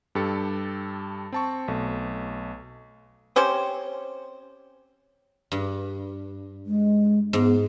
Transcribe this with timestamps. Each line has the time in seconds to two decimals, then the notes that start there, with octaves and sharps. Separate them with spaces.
0.15 G2 G4 A4 A6 C#7
1.32 C4 A5 C#6
1.68 B1 A3
3.36 C4 C#4 G4 C5
5.52 G2
6.67 G#3
7.33 G#2 B3